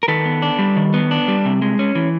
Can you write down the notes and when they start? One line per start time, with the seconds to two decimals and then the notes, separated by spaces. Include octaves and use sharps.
0.03 A#4
0.08 D#3 A4 B4
0.25 B3
0.42 D4
0.59 G3
0.76 D#3
0.94 B3
1.11 D4
1.28 G3
1.45 C3
1.62 G#3
1.79 C#4
1.95 E3